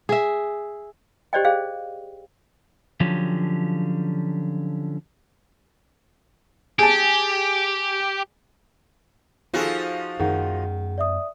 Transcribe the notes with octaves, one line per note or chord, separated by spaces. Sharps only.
G#4 E5
G4 C5 D5 D#5 G5
G#4 C5 F5 G5
D3 F3 F#3 C#4 G4
G4 G#4 A5
F3 D#4 F4 F#4 G#4 A4
F#2 D#3 A3 G#4 F#5
D5 E5 D#6